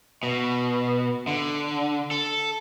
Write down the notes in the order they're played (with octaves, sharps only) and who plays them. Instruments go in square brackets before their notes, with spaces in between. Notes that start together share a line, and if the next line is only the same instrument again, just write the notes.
[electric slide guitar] B2
D3
A4